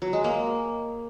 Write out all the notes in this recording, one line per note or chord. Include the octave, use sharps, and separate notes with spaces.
F#3
G#3
A#3